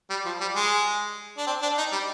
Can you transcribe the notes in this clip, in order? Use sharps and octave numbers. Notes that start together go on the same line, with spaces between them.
G3
F3
G3
G#3
D4
C4
D4
D#4
G3